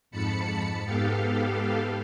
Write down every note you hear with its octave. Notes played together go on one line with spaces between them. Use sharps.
F2 G#2 A5 B5 C#7
G#2 B3 G4 A4 F5